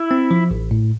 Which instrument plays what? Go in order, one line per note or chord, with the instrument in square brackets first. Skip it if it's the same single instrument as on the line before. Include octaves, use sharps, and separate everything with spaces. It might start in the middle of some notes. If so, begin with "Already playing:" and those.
Already playing: [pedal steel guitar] E4
[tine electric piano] C4
F3
A1
A2